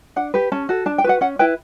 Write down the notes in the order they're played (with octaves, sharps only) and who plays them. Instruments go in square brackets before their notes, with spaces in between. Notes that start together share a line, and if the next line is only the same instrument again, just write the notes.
[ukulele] D4 F#5
G4 B4
C#4 A5
F#4 A4
D4 A5
G5
F#4 B4 F#5
C#4 F#5
E4 B4 G5